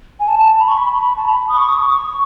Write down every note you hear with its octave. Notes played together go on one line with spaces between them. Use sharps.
G#5
A5
B5
C#6
B5
B5
A5
B5
D#6
C#6
D#6
C#6
C#6